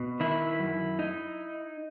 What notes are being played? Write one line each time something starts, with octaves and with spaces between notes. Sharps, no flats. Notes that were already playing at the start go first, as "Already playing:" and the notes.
Already playing: B2
D#3 E4
F#2
D#4